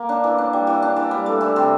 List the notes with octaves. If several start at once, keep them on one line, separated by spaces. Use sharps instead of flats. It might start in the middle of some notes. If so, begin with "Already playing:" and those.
Already playing: A#3
D4
E3
D4
G3
E3
D4
E3
G3
A3
E3
C3